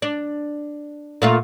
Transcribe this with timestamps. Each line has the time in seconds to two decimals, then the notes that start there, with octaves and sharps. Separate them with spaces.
0.02 D4
1.22 A#2 A3 F4